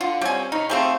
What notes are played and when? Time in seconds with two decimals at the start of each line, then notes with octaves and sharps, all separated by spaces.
0.01 D3 F4 F#5
0.21 G3 C4 C#4 C5 G#5
0.52 D#4 B5 C#6 F6
0.69 F3 A3 C4 G4 G#4 C5